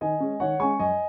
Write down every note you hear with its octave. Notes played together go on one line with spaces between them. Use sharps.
D#3 D#5 G#5
G#3 C#4
D#3 C#5 F#5
G#3 C#4 G#5 C#6
F#2 D#5 G#5